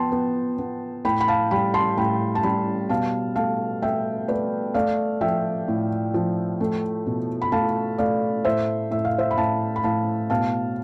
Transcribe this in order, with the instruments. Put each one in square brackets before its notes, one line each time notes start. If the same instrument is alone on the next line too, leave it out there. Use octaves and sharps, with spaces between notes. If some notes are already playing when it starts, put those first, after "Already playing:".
Already playing: [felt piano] F3 B3 G5 A5 C6
B3
B3
A2 G5 B5
B5
F5 A5
G3 G5 B5
A5 C6
A2 G5 B5
A5
G3 G5 B5
B2 F5 A5
A3 F5 A5
A3 E5 G5
A3 B4 D5
A3 D5 F5
F3 E5 G5
A2
F3
A3
B2
B5
A3 F5 A5
A3 D5 F5
A2 C5 E5
A2 E5
F5
C5 E5
B5
A2 F5 A5
B5
A2 F5 A5
B2 F5 A5